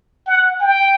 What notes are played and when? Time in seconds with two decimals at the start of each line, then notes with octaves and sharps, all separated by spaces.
0.27 F#5
0.61 G5